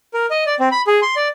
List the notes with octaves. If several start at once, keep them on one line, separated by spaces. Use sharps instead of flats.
A#4
D#5
D5
C4
B5
G#4
C6
D5